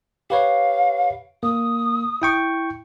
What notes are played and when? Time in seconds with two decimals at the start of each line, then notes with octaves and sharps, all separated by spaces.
0.30 G4 B4 C#5 F5
1.43 A#3 D#6
2.22 E4 G5 C#6